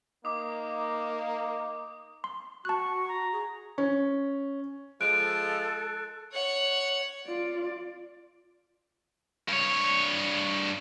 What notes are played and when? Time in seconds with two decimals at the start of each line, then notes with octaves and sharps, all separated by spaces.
0.25 A#3 D#4 D6 D#6
2.24 C6
2.65 F#4 A5 C#6 F#6
3.08 A#5
3.32 G#4
3.78 C#4
5.01 F3 G#3 A4 F#6 D7
6.32 C#5 F#5
7.27 F4 D5
9.48 G2 C#5